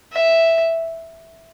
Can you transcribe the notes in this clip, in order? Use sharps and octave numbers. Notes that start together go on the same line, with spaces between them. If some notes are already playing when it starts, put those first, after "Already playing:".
E5